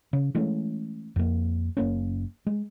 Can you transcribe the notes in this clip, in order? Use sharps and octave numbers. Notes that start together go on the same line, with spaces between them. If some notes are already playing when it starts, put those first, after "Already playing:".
C#3
E3 G#3 A3 C#4
F2 A#3
F#1 A#3 C#4
G#3